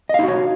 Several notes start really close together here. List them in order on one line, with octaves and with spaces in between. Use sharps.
D#5 F5 D#4 F#4 C#5